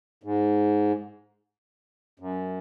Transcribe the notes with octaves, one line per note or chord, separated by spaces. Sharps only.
G#2
F#2